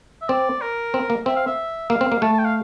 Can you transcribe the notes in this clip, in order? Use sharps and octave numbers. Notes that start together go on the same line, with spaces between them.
E5
C4 D5
A#4
C4
A#3
C4 E5
F5
E5
A#3 F5
C4
A#3
A3 A5
A5
G5
F5